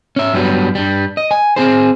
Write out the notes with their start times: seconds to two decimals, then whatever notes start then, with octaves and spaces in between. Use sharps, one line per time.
0.16 C#4 E5
0.34 G2 F#3 G3 B3
0.75 G2 G3
1.17 D#5
1.31 G#5
1.56 C4 G#4 C5